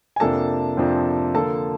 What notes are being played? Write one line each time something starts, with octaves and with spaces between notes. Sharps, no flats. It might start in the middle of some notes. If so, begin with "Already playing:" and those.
G#5
F2 C3 F3 A#3 D4 A4 A5
F2 C3 F3 A#3 D4
D3 F3 A#3 A4 A5